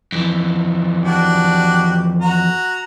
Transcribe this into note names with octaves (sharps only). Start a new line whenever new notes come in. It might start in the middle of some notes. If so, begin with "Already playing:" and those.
F2 E3
D4 F#4 G4
F#4 A#5